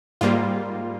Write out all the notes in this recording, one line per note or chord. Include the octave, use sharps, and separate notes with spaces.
G#2 G3 A#3 F4